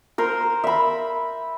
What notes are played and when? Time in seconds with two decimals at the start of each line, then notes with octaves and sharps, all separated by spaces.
0.18 A#4 C5
0.64 E5 B5